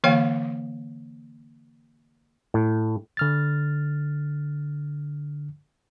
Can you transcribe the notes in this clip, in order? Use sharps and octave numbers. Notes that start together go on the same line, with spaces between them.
D3 E3 A#3 C#5 F5 G5
A2
D3 F6 A6